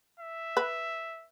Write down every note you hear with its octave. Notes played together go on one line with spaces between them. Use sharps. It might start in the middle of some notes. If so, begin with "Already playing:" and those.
E5
B4